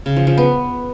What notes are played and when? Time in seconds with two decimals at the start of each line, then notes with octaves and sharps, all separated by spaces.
0.06 C#3
0.16 F3
0.27 F3
0.38 B3